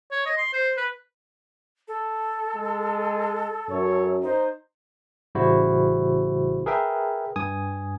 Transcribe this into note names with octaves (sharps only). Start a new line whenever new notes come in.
C#5
D#5
C6
C5
B4
A4
G#3
F#2 C#5
D#4 C5
A1 C#3 G3 E4 F#4 C5
G#4 A#4 B4 E5 G5
G2 G#5 D#6